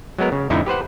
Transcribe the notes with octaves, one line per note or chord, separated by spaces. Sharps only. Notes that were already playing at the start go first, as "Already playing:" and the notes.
F#3 G#3 B3 A#4
C#3
F2 A2 D3 D#4 E4
G4 B4 C5 F#5